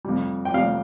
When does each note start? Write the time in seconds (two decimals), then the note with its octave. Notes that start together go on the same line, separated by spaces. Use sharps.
0.05 F2 C3 G3
0.45 G5
0.54 F2 C3 G3 F5